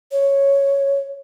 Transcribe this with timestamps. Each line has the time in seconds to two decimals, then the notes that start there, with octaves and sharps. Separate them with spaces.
0.11 C#5